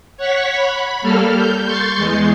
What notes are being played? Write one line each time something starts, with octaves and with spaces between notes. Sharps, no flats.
C#5 F#5 C#6 B6
B5
G3 A#3 A4 F6
G6
C6 C#6 G6 A6 C7
E2 G#3